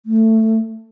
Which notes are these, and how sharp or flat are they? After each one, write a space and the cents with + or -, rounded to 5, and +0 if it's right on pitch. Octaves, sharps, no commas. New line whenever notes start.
A3 +15